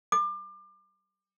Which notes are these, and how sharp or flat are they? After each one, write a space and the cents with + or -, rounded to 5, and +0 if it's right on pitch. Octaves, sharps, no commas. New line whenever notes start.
D6 +30